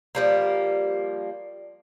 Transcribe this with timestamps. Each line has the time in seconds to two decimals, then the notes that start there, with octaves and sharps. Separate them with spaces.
0.15 F3 G3 A#3